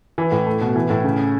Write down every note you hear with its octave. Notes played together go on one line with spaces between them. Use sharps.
E3
A2
A3
B2
E3
A2
C#3